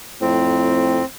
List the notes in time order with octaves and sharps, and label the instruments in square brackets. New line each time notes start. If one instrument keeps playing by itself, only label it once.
[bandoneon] F2 [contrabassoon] A2 [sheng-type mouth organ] C4